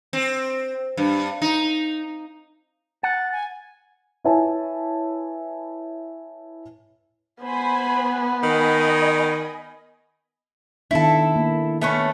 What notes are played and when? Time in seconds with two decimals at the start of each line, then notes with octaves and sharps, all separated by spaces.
0.13 C4
0.97 G2
1.42 D#4
3.03 F#5 A6
3.32 G#5
4.24 E4 B4 C#5 E5 G#5 A5
7.43 B3 C5 G#5 B5
8.43 D#3 D#5 G#5 B5
10.91 D#3 B3 D4 E4 A4
11.36 A#3
11.81 A3 B3 C#4